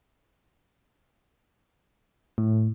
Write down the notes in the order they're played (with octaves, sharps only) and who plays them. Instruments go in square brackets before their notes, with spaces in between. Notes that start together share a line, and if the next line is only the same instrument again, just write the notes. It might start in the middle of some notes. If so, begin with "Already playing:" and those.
[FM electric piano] A2